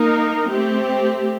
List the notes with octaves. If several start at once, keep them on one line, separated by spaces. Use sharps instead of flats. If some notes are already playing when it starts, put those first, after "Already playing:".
Already playing: A#3 D#4 A#4
A3 C4 G4